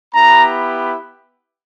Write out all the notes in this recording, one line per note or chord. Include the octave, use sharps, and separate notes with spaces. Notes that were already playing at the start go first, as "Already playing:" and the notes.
B3 E4 G4 A#5